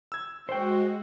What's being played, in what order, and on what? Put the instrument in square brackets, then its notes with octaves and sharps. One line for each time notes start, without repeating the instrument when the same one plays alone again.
[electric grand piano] E6 G#6
[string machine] G#3 [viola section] F#4 [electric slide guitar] C5 G5